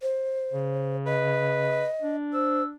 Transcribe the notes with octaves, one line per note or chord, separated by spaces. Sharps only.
C5
C#3
B4 D#5
D4
C5 E6